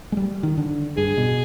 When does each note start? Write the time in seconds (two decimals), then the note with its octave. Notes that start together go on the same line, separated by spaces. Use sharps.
0.12 G#3
0.17 G3
0.43 D#3
0.57 D3
0.97 G2 G#4
1.18 B2